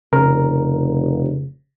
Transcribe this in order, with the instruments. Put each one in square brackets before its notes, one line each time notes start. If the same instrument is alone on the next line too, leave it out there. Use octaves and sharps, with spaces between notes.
[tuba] F1 [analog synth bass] C#3 [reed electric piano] A#4